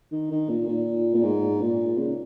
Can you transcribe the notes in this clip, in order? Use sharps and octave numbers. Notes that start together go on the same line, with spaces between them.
D#3
D#3
A#2
A#2
A#2
G#2
A#2
C#3